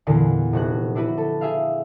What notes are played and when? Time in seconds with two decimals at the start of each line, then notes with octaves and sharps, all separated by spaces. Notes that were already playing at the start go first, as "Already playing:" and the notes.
0.07 E2 A#2 D3
0.53 F1 F#4 F#6
0.95 D4 E4 F#4 B4
1.18 A4
1.41 G#4 E5 F5